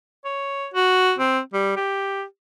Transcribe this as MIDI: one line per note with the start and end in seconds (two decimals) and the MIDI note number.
0.25 0.66 73
0.74 1.13 66
1.19 1.39 60
1.53 1.75 55
1.76 2.24 67